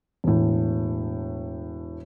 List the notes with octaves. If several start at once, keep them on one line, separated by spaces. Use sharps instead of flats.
E1 A2